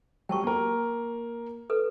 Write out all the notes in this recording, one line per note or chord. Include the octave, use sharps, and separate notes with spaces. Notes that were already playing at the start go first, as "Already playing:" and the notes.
F#3 G3 G5 A5 C#6
A#3 A#4
A4 B4